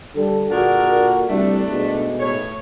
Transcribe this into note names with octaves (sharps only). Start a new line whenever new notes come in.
D3 G3 A4
A#2 D3 D4 F#4 G#4 A#4
C2 G3 A3 D4
G#2 B2 G#3
A2 C#5